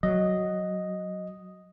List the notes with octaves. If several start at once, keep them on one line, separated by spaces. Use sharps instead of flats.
F#3 D#5